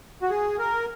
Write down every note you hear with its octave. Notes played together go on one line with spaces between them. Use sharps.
F#4
G#4
A#4